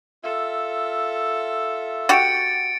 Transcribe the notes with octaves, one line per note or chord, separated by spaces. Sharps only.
F4 A4 E5
F#4 G4 A6 C#7 D7